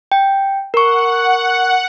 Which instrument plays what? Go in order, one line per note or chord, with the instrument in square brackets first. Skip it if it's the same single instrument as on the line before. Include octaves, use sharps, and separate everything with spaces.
[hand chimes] G5
[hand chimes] A#4 C#6 [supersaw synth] F#5